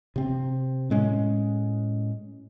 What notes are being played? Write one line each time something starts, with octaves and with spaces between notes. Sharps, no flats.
C3 C4
A2 G#3 C#4